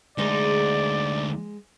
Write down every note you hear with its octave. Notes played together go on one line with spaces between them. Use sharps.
D2 G#3 D#4 G#4 C5 D5